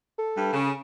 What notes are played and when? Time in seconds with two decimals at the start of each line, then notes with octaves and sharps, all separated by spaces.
0.19 A4
0.37 G2
0.53 C#3